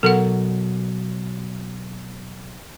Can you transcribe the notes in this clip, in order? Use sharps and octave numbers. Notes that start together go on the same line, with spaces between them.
B2 F#3 A4 A#4 F#5